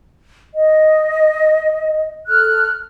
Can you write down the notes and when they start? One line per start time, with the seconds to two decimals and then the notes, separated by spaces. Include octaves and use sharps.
0.54 D#5
2.27 A4 F6 F#6